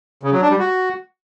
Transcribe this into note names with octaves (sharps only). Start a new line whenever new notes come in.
C#3
F#3
D4
G3
F#4